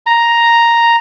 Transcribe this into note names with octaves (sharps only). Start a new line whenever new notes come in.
A#5